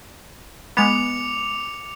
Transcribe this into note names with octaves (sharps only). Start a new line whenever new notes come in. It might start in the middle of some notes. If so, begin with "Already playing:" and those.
G#3 B3 D6 C#7 F7